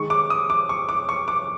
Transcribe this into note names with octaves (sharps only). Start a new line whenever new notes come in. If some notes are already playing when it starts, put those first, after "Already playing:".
Already playing: D#3 G#3 C#6
D6
D#6
D6
C#6
D6
C#6
D6